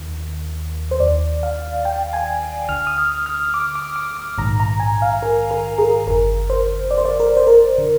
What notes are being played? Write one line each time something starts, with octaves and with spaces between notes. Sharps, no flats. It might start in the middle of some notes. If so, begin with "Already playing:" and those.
Already playing: D#2 D#3
C5
D#2 D#3 D5
F5
G5
G#5
D2 D3 F6
D#6
F6
F6
D6
D6
D6
D6
A#1 G#2 D#3 A#5
A#5
G#5
F5
A#4
A#4
G#4
G1 F2 D3 A#4
C5
D5
C5
D5
A#4
C5
A#4
D3